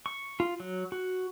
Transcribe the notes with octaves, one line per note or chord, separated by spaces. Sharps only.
C#6
F4
F#3
F#4